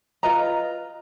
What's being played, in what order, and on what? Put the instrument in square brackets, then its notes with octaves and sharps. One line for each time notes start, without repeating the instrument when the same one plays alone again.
[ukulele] F4 B4 D#5 A#5